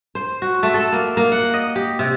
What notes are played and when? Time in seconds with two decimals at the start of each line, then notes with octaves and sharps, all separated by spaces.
0.15 C5
0.42 F#4
0.63 A3
0.74 A4
0.92 A#3
1.17 A#3
1.32 F#5
1.54 D#5
1.76 G4
1.99 C3